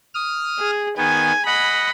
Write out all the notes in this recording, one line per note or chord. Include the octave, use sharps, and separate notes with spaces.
D#6 F6
G#4
D#3 B3 G#5
D#5 F#5 B5